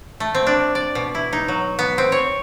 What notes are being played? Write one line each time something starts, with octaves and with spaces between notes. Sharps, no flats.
A3
C4
D4
D5
B2
E4
D#4
F#3
B3
C4
C#5